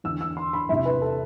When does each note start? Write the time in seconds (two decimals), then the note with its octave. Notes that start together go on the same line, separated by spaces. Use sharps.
0.04 E2 D3 E6
0.21 E6
0.37 C6
0.53 B5
0.69 E2 C3 E3 E5
0.86 B4
1.02 A4